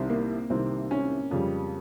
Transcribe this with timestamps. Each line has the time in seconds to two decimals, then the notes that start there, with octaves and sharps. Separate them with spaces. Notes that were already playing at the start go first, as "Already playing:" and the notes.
Already playing: C2 C3 D#3 C4
0.10 A#3
0.50 C2 C3 D#3 C4
0.91 C#4
1.31 F2 C#3 G3